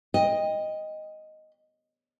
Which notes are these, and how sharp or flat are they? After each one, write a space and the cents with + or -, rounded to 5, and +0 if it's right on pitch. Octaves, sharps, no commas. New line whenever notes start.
D#5 +0 G5 +25